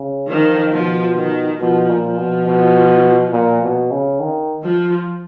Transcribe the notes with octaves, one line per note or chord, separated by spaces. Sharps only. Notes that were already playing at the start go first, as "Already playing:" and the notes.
Already playing: C#3
D#3 F3
B2 F3
D#3
B2 F3
A#2
F3
B2
B2
A#2
B2
C#3
D#3
F3